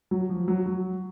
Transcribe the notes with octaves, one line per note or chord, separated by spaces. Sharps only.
F#3
F3
F#3
F#3